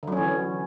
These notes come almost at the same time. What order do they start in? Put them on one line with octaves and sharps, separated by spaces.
D3 F#3 C#4 E3